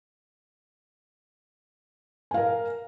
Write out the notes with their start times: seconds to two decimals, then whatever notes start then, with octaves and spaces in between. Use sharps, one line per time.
2.31 G#5
2.34 F5
2.37 A#4